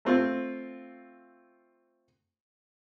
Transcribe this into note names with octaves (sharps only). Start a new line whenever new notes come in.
A3 C4 F4